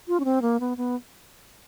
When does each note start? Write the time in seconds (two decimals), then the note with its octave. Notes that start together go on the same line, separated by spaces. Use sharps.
0.08 F4
0.20 C#4
0.25 C4
0.42 A#3
0.60 B3
0.77 B3